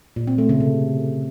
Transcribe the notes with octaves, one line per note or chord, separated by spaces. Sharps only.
A#2
C4
A3
C#3
C3